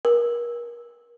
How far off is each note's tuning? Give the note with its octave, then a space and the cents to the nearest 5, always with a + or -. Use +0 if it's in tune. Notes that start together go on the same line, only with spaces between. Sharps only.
A#4 +35